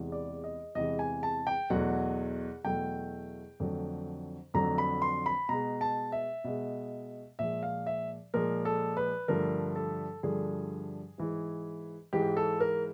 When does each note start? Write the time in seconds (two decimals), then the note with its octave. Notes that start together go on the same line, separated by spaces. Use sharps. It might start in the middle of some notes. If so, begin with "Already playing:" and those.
Already playing: E2 C3 E3 G#3
0.12 D5
0.44 D#5
0.75 E2 C3 E3 G#3 D#5
0.99 G#5
1.23 A5
1.47 G5
1.70 E2 B2 F#3 A3 F#5
2.64 E2 B2 F#3 A3 G5
3.60 F2 D3 F#3 A3
4.54 F2 D3 F#3 A3 A#5
4.78 B5
5.02 C6
5.26 B5
5.49 B2 G#3 A#5
5.81 A5
6.12 E5
6.44 B2 G#3
7.39 A#2 F3 G#3 E5
7.63 F5
7.86 E5
8.34 A#2 F3 G#3 A#4
8.65 A4
8.97 B4
9.28 G2 D3 F3 A3 A#4
9.76 A4
10.23 G2 D3 F3 A3 G#4
11.18 G#2 E3 G#3
12.13 G#2 E3 G#3 G4
12.37 A4
12.60 A#4